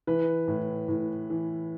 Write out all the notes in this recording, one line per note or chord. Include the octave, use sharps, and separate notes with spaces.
E3 B4
A2
A2
E3